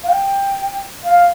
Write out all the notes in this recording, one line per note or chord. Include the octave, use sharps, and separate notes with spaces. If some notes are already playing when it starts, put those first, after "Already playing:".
F5
G5
F5